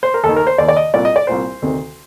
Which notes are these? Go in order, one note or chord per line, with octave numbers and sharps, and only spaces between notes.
C5
A#4
D#2 A4
D#3
A#4
C5
D#2 D#3 D5
D5
D#5
C2 A#2 D5
D#5
D5
C2 A#2 C5
D2 C3 D#3